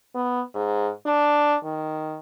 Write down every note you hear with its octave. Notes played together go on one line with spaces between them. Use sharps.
B3
G#2
D4
D#3